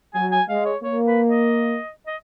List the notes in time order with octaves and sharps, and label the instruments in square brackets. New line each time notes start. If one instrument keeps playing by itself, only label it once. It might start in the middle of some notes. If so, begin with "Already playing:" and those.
[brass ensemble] F#3 [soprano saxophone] G#5
[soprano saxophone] G#5
[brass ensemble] G#3 [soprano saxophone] F5
[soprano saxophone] C#5
[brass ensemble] A#3 [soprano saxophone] C#5
[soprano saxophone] B4
D#5
D#5